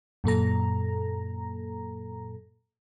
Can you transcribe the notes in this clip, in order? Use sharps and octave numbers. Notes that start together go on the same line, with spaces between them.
F#2 A#2 A4 A#5